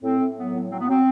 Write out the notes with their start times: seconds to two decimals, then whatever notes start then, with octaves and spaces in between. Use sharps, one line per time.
0.03 A2 C4
0.19 A2
0.37 F#3 B3
0.54 A2
0.71 F#3 C4
0.80 B3
0.89 F#3 C4